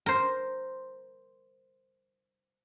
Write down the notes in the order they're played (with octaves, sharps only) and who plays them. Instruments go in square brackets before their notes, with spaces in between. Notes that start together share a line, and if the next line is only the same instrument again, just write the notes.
[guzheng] A#4 C5